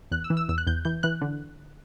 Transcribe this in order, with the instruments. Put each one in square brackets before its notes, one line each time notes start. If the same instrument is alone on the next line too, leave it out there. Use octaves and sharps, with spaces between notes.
[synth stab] E2 F#6
E6
E3
E6
E2 E6
F#6
E2 G6
E3 G6
E3 F#6
D3